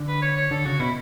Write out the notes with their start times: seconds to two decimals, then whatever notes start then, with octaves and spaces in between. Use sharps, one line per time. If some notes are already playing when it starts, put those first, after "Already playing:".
Already playing: D3
0.08 B4
0.22 C#5
0.37 C#5
0.51 D3 A4
0.65 C#3 F#4
0.80 B2 E4